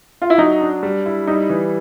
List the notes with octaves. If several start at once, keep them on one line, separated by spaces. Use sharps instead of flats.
F4
E4
F#3 D#4
D4
G3
E4
G3 D#4
E3